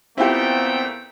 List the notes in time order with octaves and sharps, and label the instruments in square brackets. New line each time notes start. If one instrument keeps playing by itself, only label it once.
[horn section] A#2 A3 G5 [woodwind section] B3 [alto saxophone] C4 [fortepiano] E4 F4 G4